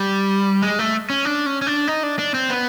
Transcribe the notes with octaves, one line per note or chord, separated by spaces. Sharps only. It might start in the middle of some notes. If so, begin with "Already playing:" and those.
Already playing: G3
G#3
A3
C#4
D4
C#4
C#4
D4
D#4
D4
D4
C4
B3